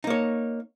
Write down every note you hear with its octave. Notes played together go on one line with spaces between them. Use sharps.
A#3 D#4 C#5